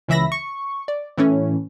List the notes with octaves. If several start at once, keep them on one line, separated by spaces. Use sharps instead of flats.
C#2 C#3 E3 E5 B5 A#6
C#6
D5
A2 E3 A3 C#4